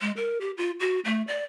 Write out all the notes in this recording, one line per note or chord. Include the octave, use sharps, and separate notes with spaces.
G#3
A#4
G4
F4
F#4
A3
D5